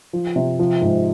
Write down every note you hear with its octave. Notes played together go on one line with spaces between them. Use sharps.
F3
C3
F3
G#2